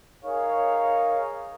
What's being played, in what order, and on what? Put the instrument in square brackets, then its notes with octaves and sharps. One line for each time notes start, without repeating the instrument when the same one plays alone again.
[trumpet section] D#4 G#4 A#4 C#5 F5